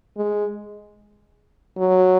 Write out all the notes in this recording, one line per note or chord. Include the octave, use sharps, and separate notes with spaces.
G#3
F#3